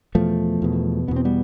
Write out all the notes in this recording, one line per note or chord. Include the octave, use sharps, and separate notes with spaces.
E2 B2 F3 A3
E2 B2
E2 B2 B3
C4
G3 B3